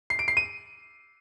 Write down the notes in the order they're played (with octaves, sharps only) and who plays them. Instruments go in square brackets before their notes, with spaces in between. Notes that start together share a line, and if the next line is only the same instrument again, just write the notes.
[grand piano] C7
D7
C7
D#7